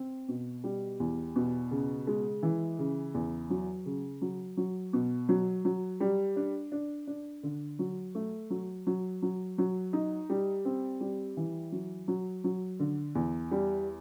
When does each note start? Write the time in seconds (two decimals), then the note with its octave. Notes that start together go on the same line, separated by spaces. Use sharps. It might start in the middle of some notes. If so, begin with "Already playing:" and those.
Already playing: C4
0.28 B2
0.64 G3
1.00 E2
1.36 B2
1.71 C#3
2.07 G#3
2.43 E3
2.79 C#3
3.14 E2
3.50 F#3
3.86 C#3
4.22 F#3
4.57 F#3
4.93 B2
5.29 F#3
5.65 F#3
6.00 G3
6.36 D4
6.72 D4
7.07 D4
7.43 D3
7.79 F#3
8.15 A3
8.50 F#3
8.87 F#3
9.22 F#3
9.58 F#3
9.93 D#4
10.30 G3
10.65 C4
11.00 G3
11.37 E3
11.72 F#3
12.08 F#3
12.44 F#3
12.79 D3
13.15 E2
13.51 G3